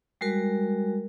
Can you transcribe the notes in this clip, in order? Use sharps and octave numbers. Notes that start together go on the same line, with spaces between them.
G3 G#3 F#4 A#4